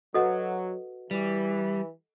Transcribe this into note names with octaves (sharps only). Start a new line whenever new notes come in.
F#3 F#4 A4 B4 D#5 F#5
E3 G3